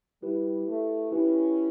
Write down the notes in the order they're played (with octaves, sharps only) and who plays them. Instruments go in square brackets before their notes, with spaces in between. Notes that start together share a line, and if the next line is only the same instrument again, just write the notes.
[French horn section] G3 [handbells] E4 G4 B4
[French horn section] A3
[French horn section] C#4 [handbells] E4 G4 B4